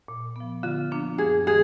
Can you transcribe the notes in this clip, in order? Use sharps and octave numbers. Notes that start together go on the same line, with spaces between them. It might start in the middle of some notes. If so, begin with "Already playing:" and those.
A#2
F3 B3
D3 F4
F3 A#3 D4
F#2 G#4
D#3 G#3 D4 G#4